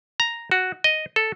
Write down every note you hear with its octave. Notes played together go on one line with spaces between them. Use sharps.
A#5
F#4
D#5
A4